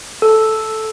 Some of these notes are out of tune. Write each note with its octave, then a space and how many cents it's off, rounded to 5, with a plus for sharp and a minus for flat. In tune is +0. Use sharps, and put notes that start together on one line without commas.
A4 -5